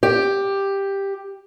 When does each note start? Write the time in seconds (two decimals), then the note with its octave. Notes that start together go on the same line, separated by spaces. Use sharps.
0.03 G4